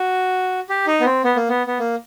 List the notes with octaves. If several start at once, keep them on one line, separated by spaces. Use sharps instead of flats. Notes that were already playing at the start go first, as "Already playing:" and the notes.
Already playing: F#4
G4
D#4
B3
C4
B3
A#3
B3
B3
A#3